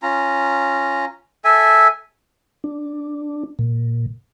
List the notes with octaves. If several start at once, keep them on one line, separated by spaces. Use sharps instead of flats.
C#4 F4 A#5
A4 E5 G#5
D4
A#2